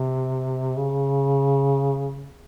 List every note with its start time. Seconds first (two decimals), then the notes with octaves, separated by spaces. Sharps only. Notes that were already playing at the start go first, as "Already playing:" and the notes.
Already playing: C3
0.76 C#3